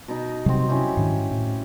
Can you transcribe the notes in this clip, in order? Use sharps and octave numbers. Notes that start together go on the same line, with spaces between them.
B2 D#4
C3 F#3 G3 C4 F#4
C#4 E4 G4
G#2 D#3 D4
A2